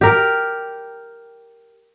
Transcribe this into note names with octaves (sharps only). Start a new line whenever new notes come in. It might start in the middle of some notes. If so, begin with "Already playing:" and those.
G4 A#4